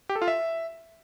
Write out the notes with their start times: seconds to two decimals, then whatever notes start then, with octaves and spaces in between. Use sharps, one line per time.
0.09 G4
0.16 A4
0.22 F4
0.28 E5